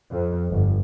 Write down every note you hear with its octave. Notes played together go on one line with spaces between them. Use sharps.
F2
G1